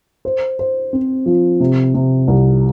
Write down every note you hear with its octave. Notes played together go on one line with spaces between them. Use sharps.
C5
C5
C4
F3
C3
C3
C2